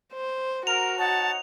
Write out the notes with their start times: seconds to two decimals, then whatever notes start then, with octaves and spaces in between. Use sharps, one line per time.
0.13 C5
0.67 F#4 A#4 F7
0.98 D#4 C#5 F#5 A5